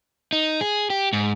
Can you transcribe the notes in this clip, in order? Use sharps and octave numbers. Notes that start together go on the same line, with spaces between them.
D#4
G#4
G4
G#2